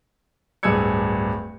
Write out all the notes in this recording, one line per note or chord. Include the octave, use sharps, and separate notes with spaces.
D1 G2 G#4 E6 G#6 C#7